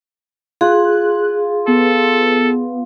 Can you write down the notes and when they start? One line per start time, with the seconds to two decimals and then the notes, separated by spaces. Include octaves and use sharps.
0.61 F4 G#4 F#6
1.68 B3 A4